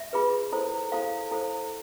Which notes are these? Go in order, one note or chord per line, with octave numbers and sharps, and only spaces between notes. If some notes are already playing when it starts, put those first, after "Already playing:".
Already playing: E5
F4 G#4 B4
E4 A4 C5
E4 A4 C5 F5
E4 A4 C5